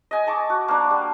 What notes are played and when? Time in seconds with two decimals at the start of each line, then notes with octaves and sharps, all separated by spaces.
0.11 D#5 G#5
0.27 A5 C#6 D6
0.50 F#4
0.68 A#3 D4
0.90 G3